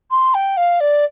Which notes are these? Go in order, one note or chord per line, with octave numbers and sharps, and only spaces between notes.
C6
G5
F5
D5